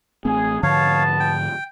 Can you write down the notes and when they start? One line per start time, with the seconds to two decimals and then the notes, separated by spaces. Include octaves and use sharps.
0.25 A1 A3 C4 G#4
0.63 G#2 D3 F3 B3 C#5 F5 A5
1.20 G5